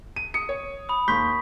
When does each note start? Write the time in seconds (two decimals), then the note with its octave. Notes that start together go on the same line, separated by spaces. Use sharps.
0.16 D#7
0.34 D#6 C#7
0.49 C#5
0.89 B5 D#6
1.08 D#2 C6 C#6 G6 B6